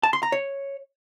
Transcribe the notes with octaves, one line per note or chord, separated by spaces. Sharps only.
A5
C6
A#5
C#5